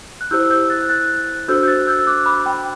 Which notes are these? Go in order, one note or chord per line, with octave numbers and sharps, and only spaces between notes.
F#6
E4 G4 C5 E6 G6
E6 G6
F#6 A6
F#6 A6
D4 F#4 A4 C5 E6 G6
G6
F#6 A6
E6 G6
D6 F#6
B5 D6
G5 B5